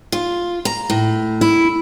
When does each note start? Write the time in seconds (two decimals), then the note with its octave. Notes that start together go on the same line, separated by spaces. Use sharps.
0.12 F4
0.65 A#5
0.90 A2
1.41 E4